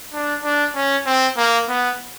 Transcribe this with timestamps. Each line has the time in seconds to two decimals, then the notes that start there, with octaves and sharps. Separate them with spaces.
0.13 D4
0.44 D4
0.75 C#4
1.06 C4
1.37 A#3
1.68 B3